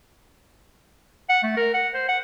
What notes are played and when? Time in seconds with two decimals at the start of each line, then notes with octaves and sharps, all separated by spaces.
1.29 F#5
1.43 A3
1.57 A#4
1.74 F#5
1.94 C5
2.09 F#5